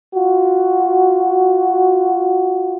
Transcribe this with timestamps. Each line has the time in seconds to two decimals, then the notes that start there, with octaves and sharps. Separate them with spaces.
0.14 F4 F#4